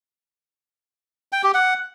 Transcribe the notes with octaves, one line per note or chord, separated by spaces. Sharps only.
G5
G4
F#5